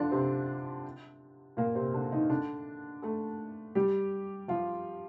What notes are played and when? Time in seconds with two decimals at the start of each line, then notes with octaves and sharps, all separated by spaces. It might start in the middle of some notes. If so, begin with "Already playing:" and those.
Already playing: D3 F3 D4 F4
0.11 C3 C4
1.57 A#2 A#3
1.75 C3 C4
1.94 D3 D4
2.12 D#3 D#4
2.30 D3 D4
3.02 A3 A4
3.75 G3 G4
4.48 F3 F4